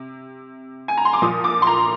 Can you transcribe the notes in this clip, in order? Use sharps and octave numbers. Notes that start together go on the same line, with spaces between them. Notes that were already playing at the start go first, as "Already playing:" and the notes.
Already playing: C3
G#5
A#5
C6
D6
A#2 F3 D#6
D6
C6
A#5